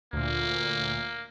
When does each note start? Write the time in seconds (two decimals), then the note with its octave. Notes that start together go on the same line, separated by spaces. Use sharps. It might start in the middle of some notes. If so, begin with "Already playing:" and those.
0.13 D2 A#2 A#3